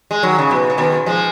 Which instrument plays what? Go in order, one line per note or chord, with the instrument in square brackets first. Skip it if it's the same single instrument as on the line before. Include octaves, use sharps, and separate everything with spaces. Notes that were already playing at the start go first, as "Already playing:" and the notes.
[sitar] G#3
D#3 F#3
C#3
B2
C#3
B2 D#3
F3 G#3